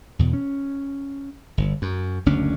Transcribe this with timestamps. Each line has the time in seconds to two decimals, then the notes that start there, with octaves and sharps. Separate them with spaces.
0.19 E2 B2
0.33 C#4
1.58 G1
1.82 F#2
2.26 F#1 D2 C#4 D4